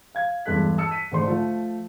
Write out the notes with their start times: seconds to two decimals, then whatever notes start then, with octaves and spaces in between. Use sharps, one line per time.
0.15 F5 G#6
0.46 E2 G2 G#3 A4 F#6 B6
0.78 A5 E6 C#7
0.91 B6 D#7
1.12 G#2 D3 A3 C5 D5 C6
1.28 F3 A3